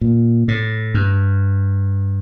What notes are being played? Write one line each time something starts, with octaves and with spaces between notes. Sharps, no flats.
A#2
A2
G2